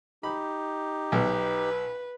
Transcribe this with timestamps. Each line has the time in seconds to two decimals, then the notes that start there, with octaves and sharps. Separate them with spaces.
0.23 D#4 G4 B5
1.12 B1 B4